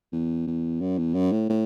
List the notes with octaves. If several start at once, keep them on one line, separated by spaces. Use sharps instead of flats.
E2
E2
F#2
E2
F#2
A2
A2